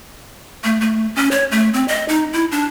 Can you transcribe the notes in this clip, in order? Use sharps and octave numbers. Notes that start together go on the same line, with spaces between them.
A3
A3
C#4
C#5
A3
C4
D#5
D#4
E4
D4